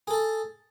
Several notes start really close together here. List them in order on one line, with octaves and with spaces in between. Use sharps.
G#4 A4 A5